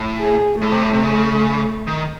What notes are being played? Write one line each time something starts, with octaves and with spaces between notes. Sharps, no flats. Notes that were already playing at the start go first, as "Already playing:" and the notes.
Already playing: A2
G#4
A2 A3
C3
A2
C3
C#3
D#3